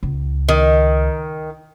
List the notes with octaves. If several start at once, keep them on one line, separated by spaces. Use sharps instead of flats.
C#2
D#3